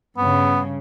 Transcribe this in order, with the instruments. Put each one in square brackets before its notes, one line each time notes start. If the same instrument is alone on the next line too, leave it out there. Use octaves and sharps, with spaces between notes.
[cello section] G2 C#3 [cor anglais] B3